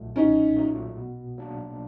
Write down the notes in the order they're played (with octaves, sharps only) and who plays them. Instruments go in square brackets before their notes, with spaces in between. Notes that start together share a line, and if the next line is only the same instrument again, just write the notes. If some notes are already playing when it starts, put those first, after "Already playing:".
Already playing: [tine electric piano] B1 A#2 F#3 A3
[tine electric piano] B1 [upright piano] C#4 D#4
[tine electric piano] A#2 F#3 A3
B2
F#3 A#3 D4